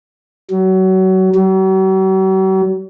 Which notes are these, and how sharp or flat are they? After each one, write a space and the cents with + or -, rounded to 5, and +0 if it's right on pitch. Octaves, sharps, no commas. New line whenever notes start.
F#3 +25
F#3 +45